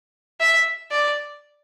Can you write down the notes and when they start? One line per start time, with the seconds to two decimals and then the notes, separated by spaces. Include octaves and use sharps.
0.40 E5
0.91 D5